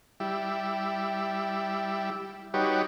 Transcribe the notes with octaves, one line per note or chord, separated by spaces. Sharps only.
G3 E4
G3 D#4 F#4 G4 B4 C#5